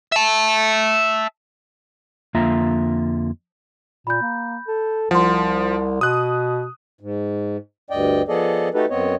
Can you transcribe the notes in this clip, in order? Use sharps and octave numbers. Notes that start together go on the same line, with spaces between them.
E5 A5
F2 D3 A#3 F4 E5 A#5
A#2 B5 G6
A#3
A4
C2 F3 F#5 C6
B2 D#6 F#6
G#2
D2 G2 D5 D#5 G5
F3 B3 G#4 A4 D5 D#5
A3 D#4 F#4 G4 A4 B4
F#2 B3 C4 C#5 D#5